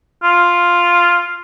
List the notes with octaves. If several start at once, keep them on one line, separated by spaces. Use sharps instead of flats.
F4